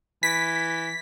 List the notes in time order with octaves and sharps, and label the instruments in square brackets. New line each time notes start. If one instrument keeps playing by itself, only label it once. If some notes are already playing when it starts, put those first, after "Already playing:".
[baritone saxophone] E3 [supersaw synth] B6